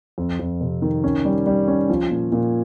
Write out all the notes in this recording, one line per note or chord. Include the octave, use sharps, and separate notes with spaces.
F2
F2
C3
D#3
C#4
G3
G3
C#4
F3
A#2
A#2